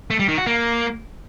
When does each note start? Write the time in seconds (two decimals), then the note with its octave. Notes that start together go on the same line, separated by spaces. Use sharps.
0.10 A3
0.19 G3
0.29 D#3
0.38 F#4
0.47 A#3